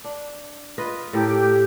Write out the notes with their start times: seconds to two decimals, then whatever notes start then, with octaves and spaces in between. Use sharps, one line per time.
0.04 D4
0.78 F4 B4 D#5
1.13 A2 G4 A4 A#4